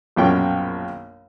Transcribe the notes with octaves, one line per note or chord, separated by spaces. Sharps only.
A#1 F#2 B2 C#4 G5 C#6